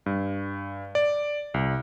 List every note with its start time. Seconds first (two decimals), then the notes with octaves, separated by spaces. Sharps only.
0.06 G2
0.95 D5
1.54 C2